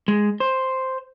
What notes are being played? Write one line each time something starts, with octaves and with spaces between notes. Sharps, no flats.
G#3
C5